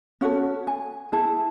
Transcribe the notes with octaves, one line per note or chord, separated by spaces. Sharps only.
C#4 F#4 A4 F#5
G#5
E4 G#4 A5